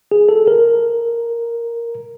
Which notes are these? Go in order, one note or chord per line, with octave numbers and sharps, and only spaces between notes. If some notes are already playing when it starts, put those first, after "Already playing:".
G#4
A4
A#4